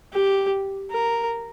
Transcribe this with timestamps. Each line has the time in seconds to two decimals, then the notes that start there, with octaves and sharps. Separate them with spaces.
0.13 G4
0.91 A#4